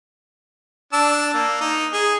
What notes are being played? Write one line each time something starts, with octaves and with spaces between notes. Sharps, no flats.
D4 A5 E6
A#3
D#4
G#4